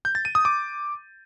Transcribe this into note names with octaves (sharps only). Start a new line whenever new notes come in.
G6
A6
D#7
D#6
D6